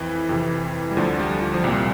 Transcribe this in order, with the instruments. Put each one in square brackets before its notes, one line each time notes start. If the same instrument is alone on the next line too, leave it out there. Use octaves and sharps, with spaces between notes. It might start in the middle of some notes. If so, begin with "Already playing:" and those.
Already playing: [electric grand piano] F2 E3
F2 C3 E3
G3
D2 D3 F3
G3
F3
F3
C2 A#2 G3